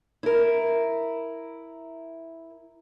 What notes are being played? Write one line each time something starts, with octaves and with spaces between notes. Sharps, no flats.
E4 A#4